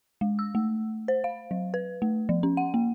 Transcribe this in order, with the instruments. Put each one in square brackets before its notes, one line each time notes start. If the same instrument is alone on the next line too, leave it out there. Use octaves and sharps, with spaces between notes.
[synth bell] G#3
E6
A3
C5
F5
F#3
B4
A3
F3
C#4
F#5
A#3